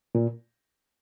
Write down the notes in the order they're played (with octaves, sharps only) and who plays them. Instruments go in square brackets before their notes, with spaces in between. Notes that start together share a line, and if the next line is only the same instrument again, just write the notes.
[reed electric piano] A#2